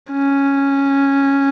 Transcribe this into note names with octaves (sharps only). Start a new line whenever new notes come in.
C#4